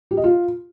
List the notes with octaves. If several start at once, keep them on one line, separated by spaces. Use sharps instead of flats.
G4
D#5
F4